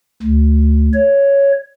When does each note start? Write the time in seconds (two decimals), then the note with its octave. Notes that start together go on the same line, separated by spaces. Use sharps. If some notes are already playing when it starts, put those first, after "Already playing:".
0.23 D2
0.94 C#5